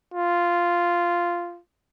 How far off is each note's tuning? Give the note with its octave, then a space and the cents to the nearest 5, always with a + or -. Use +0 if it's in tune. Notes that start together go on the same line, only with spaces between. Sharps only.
F4 -5